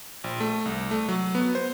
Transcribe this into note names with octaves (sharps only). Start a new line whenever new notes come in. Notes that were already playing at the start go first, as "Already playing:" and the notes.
A#1
A3
C2
A3
F#3
B3
C5